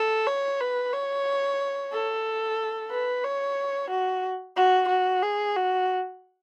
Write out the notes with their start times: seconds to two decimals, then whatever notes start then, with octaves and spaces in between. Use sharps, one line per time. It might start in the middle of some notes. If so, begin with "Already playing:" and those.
Already playing: A4
0.26 C#5
0.60 B4
0.93 C#5
1.92 A4
2.91 B4
3.24 C#5
3.90 F#4
4.56 F#4
4.89 F#4
5.22 G#4
5.56 F#4